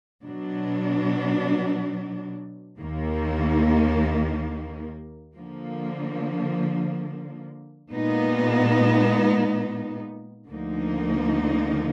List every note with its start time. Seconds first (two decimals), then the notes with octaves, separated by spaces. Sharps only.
0.23 B2 F#3 D4
2.79 D#2 D#3 A#3
5.35 D3 F3 A#3
7.92 A#2 G#3 B3 D#4
10.47 D2 D3 F3 A#3 D#4